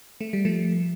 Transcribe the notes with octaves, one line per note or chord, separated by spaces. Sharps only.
A3
G3
F3 A3